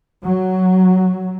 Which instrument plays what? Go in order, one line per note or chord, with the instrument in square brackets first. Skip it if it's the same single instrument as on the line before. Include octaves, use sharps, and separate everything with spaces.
[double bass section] F#3